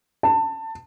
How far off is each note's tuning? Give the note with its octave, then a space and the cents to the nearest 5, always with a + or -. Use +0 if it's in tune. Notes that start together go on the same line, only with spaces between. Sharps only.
A5 +25